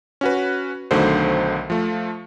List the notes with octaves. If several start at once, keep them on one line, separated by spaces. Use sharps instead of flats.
C#4 F#4 B4
B1 D3 D#3 F#3 A3 C5
F3 A3